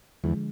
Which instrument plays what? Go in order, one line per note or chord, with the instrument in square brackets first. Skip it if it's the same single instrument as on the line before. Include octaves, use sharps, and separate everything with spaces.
[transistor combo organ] E2 [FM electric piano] D3 F3 G#3